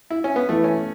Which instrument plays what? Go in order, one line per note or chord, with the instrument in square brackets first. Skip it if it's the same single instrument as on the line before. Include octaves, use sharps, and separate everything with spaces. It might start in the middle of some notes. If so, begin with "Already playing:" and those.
[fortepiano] E4
C#4
B3
[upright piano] E3 B3 E4 [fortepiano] A3
[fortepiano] C#4